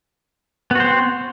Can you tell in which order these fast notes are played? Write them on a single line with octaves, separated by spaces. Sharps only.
B3 F#4 C5 C4